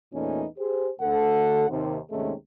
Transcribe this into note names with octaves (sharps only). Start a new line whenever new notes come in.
E2 A#2 E3 A3 C#4 D#4
G4 G#4 C5
D2 A4 F#5
D#2 C3
D#2 G#2 C3 G#3 A3 C#4